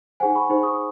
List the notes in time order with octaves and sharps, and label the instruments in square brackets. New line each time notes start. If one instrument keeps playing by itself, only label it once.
[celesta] D#4 G#4 C5 F#5 G#5
B5 C#6
D#4 G#4 C5
C#6 D#6